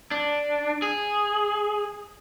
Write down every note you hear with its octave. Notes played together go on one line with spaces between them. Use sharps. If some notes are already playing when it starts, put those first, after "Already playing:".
D4
G#4